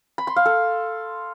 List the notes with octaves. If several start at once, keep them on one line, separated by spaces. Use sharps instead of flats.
B5
C6
F5
A4